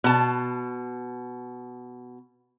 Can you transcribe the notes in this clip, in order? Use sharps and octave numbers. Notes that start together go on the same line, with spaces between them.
B2 A5